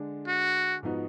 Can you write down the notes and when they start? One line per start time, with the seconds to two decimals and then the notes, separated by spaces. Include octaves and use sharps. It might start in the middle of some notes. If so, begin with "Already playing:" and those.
Already playing: D3 G#3 D4
0.27 F#4
0.83 G#2 F3 B3 D#4 F#4